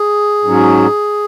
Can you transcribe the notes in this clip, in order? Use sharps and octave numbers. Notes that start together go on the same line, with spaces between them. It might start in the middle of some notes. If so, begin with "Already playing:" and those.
Already playing: G#4
G#2 F#3 C#4